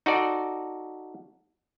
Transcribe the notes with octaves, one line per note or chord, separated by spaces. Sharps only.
D#4 F#4 A4 D5